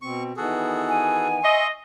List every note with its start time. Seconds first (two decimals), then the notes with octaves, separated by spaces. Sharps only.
0.02 B2 C4 C#6
0.37 D#3 E3 B3 F#4 G#4 A4
0.89 G#5
1.43 D#5 E5 C6 C#6